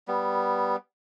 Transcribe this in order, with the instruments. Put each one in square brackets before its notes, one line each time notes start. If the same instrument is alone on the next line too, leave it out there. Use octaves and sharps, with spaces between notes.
[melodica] G3 B3